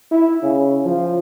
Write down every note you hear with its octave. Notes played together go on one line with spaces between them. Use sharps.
E4
C#3
F3